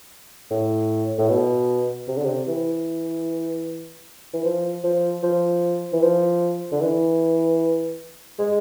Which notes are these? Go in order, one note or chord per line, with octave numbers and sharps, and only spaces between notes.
A2
A2
B2
C3
D3
C3
E3
E3
F3
F3
F3
E3
F3
D3
E3
G#3